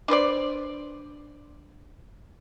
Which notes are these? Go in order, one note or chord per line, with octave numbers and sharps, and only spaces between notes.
D4 B4 C5 D5